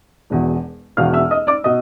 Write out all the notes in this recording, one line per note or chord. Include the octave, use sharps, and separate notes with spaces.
E1 E2 B2
E1 E2 B2 F5 F6
E5 E6
D#5 D#6
D5 D6
B2 D#5 D#6